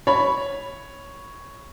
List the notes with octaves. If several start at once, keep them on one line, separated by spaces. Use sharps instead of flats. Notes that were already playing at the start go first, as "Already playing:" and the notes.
C#5 B5